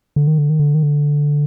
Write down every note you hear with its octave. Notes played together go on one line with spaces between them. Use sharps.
D3
D#3
D3
D#3
D3
D#3
D3